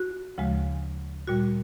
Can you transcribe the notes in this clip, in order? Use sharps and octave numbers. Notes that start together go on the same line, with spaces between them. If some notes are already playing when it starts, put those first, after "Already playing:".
Already playing: F#4
D2 C#3 F3 G#3
A#2 G3 F#4